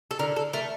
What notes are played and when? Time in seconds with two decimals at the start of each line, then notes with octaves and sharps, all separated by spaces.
0.11 A4
0.19 D3 A#4
0.36 A4
0.53 A3 A#4